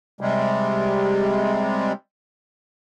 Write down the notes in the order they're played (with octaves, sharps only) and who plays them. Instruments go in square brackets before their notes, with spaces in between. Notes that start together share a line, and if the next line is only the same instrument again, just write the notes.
[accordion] C3 G3 G#3